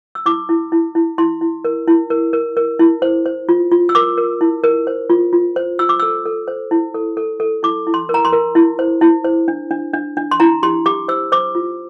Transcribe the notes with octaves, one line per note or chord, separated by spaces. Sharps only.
E6
E4 D6
E4
E4
E4
E4 C6
E4
A#4
E4
A#4
A#4
A#4
E4
C5
C5
F4
F4
E6
A#4 D6
A#4
E4
A#4
C5
F4
F4
C5
F4 E6
D6
A4 E6
A4
C5
E4
A4
A4
A4
E4 D6
E4
C6
A#4
A#5
C6
A#4
E4
C5
E4
C5
D4
D4
D4
D4
C6
E4 A#5
G4 C6
G4 D6
C5 E6
C5 D6
F4